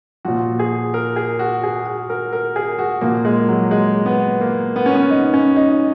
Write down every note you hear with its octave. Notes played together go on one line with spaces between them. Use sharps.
A#2 F3 F#4
G#4
A#4
G#4
F#4
G#4
F#4
A#4
A#4
G#4
F#4
A#2 F3 A#3
G#3
F#3
G#3
B3
A#3
B3
C#4
B3
D#4
C#4
D#4